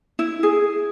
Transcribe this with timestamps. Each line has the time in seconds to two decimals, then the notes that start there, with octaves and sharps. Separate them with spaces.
0.19 E4
0.43 G#4